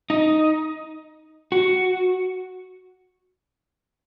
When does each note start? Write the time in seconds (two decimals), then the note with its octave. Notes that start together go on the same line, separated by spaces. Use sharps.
0.10 D#4
1.52 F#4